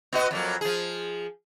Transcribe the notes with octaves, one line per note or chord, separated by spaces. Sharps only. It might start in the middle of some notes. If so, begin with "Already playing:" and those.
B3 F#4 D#5
F2 F#3 A#3
F3 G#4